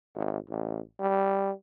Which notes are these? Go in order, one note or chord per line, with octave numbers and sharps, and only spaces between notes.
G#1
A1
G3